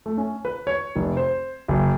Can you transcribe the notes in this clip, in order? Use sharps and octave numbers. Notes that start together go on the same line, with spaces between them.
A3
C#4
B4
C#5
F1
C5
F#1